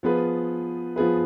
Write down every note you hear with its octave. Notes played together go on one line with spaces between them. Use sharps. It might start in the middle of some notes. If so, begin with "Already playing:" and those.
F3 B3 F4 G#4 B4
F3 B3 F4 G#4 B4